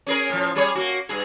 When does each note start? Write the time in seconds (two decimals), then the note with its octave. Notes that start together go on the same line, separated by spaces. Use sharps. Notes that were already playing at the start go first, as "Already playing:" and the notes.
0.07 C#4 G#4 A#4
0.29 A2 F3
0.55 G3 G#4 C#5
0.75 A#3 F#4
1.09 G2 G#4